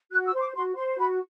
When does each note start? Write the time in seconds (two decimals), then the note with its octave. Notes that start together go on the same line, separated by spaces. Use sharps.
0.12 F#4 F#6
0.27 E6
0.33 C5 C6
0.40 D6
0.54 F#4 C6
0.76 C5 C6
0.97 F#4 B5